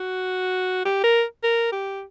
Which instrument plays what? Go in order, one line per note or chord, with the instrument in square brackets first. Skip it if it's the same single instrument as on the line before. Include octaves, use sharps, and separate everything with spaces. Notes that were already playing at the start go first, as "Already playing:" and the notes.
Already playing: [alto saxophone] F#4
G4
A#4
A#4
G4